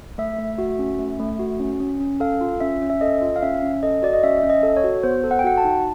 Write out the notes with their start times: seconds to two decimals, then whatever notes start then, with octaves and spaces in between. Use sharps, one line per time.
0.18 A3 E5
0.39 A3
0.58 F#4
0.79 C#4
0.99 A3
1.20 A3
1.39 F#4
1.60 C#4
1.80 C#4
2.00 C#4
2.20 A4 F5
2.41 F4
2.60 C#4 E5
2.82 C#4
2.90 E5
3.01 A4 D#5
3.22 F4
3.36 F5
3.43 C#4 E5
3.62 C#4
3.83 A4 D#5
4.02 F#4 D5
4.13 D#5
4.23 C#4 E5
4.38 C#4 E5
4.50 D#5
4.63 A4
4.77 C#5
4.84 F#4
5.03 B3 C5
5.24 A4
5.31 F#5
5.39 G5
5.44 F#4 F#5
5.58 A5
5.64 D#4